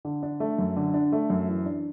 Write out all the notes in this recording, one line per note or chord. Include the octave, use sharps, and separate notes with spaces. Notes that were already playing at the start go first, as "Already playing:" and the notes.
D3
D4
A3
F#2
D3
D4
A3
F#2
E3
D4